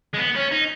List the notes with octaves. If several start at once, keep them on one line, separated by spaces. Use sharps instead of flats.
G#3
B3
C#4
D#4